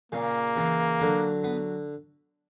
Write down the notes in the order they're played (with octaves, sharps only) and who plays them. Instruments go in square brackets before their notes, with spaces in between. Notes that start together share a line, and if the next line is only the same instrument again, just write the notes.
[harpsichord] A#2 C#3 [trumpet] A#3
[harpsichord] C#3 E3
D3 F#3
B3